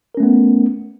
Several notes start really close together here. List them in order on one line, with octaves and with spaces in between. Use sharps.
A#4 C#4 A3 B3